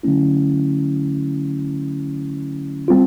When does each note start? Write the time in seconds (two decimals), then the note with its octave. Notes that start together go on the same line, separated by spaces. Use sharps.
0.03 D3 F#3 A3 C#4 E4
2.88 G3 C4 F4